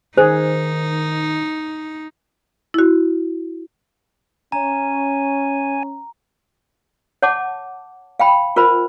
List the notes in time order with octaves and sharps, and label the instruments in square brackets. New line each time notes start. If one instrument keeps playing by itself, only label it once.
[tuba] D#3 [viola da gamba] D#4 [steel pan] G#4 [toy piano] C5
[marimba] E4 F#4
[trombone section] C#4 [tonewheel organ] G#5 [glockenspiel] A#5
[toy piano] C#5 F#5 A5 D6
F5 G5 B5
F4 A#4 C5 B5